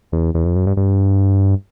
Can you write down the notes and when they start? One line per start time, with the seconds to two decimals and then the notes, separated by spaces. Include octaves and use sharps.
0.12 E2
0.34 E2
0.45 F2
0.56 F#2
0.67 G2
0.77 G2